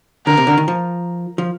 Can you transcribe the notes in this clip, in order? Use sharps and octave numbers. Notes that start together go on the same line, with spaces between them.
D3 A#4
C3
D3
D#3
F3
F3